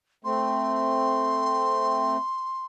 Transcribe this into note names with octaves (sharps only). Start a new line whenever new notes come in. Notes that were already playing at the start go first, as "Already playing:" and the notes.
A3 C4 C6